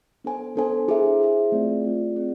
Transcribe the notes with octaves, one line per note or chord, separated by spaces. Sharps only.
B3 D4 A4 C5 G#5
B3 D4 A4 C5 G#5
E4 G#4 C5 E5
E4 G#4 C5 E5
A3 C4 F4 G#4 D5
A3 C4 F4 G#4 D5
C4 G#4 D5